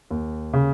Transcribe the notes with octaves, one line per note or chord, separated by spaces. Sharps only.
D#2
C#3